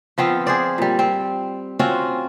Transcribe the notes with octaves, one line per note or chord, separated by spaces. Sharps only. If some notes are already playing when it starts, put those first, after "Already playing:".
F3 B3 C4 F4
G#4 C5 D5
A#2 G3
C4
C4 C#4 F4 F#4